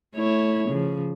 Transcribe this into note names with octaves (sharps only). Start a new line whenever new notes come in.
A3 E4 C#5
C#3 F3